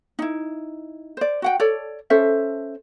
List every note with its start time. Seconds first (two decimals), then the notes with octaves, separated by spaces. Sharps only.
0.19 D#4 E4
1.17 C5 D5
1.42 F#4 F#5 G5
1.60 A4 C#5 D5
2.10 C#4 A4 C5 E5